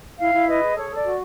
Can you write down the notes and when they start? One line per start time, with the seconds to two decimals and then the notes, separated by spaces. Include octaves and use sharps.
0.18 E4 F5
0.33 E4
0.47 B4 D#5
0.61 G#4
0.75 A4 C#5
0.90 A4
0.95 D5
1.04 F#4